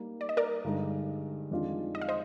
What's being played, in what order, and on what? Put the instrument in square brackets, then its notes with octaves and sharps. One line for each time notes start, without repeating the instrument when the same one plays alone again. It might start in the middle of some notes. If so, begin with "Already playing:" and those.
Already playing: [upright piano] G3 A#3 D#4
[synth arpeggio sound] D5
D#5
A#4 D5
[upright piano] G2 D3 G#3 D#4
F2 D#3 G#3 D4 F4
[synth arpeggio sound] D#5
F5
C5 D#5